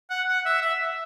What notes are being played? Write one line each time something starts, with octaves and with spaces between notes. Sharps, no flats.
F#5
F#5
E5
E5